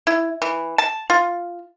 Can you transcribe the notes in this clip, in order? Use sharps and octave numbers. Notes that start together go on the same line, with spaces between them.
E4
E3
A5
F4